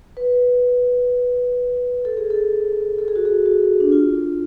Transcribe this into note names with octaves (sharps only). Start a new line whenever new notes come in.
B4
A4
G#4
A4
A4
G#4
F#4
G#4
F#4
D4
F4